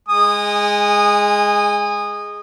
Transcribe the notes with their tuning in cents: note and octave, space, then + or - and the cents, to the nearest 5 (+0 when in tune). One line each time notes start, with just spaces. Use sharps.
G#3 +0 G#5 -25 D#6 -15